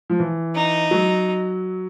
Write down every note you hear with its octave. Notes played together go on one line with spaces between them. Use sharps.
F3
E3
D#4
F#3